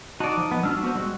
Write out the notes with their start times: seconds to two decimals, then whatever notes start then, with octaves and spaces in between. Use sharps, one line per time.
0.20 D#4 F#4 D5 A5
0.37 F3
0.51 B3
0.63 G3 D4 F#4 E6 F6
0.83 B3 F#4 C5
0.95 G3 G#3 F#4